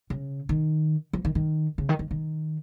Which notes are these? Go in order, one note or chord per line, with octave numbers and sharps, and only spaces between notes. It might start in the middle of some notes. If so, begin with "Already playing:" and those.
C#3
D#3
F3
D#3
D#3
C#3
D#3
D#3
D#3